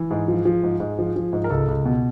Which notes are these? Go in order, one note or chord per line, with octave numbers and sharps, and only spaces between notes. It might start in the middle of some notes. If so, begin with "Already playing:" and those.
Already playing: E3
G#2 G#4
F3
F3
G#2
G#2
F3
F3
G#2
A#4
C#2 A4
C#2
B2